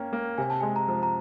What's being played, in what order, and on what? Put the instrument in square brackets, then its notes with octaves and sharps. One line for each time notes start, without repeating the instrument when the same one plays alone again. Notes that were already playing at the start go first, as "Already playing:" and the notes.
Already playing: [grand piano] A#3 C#4 [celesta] G5
[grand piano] A#3
[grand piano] C3 [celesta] G#5
[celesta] A5
[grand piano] G#3 [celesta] G#5
[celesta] A#5
[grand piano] F3
[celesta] A#5